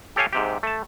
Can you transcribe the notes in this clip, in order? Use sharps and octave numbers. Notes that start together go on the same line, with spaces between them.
G4 A4 C#5 F5 G#5
G#2 C3 G4
A3 A5